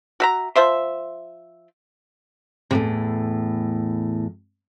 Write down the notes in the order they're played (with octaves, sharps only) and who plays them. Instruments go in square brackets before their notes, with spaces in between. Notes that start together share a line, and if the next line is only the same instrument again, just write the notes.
[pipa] F#4 E5 A#5
F3 C5 E5 C6
[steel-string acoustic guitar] E2 A2 C3